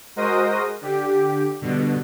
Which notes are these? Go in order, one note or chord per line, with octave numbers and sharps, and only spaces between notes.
G#3 F#4 A#4 C5 D#5 D#6
D3 G4
G2 B2 D3